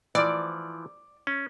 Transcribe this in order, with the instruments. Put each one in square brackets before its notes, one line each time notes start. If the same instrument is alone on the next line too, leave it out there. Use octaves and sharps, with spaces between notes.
[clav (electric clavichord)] E3 F3 [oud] D5
[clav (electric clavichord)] C#4